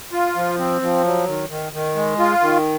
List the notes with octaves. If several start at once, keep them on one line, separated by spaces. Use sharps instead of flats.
F4
F3
C4
F3
F#3
D#3
D#3
D#3
G#3
F4
D#3